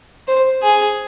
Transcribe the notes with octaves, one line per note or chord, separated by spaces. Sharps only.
C5
G#4